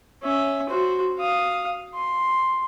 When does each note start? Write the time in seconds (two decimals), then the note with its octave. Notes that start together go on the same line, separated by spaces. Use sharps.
0.23 C#4 E5
0.69 F#4 C5
1.19 F5 D#6
1.95 C6